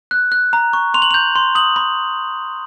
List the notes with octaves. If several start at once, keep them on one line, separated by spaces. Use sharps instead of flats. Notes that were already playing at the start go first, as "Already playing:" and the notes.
F#6
F#6
A#5
C#6
C6 F7
F#7
G6 F7
C6
D#6 F#7
B5